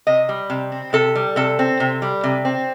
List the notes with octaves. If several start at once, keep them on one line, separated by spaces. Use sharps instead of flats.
C3 D#5
G3
C3
C4
C3 A4
G3
C3 A4
C4
C3
G3
C3
C4